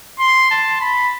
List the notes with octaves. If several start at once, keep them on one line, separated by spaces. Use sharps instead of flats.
C6
A5
B5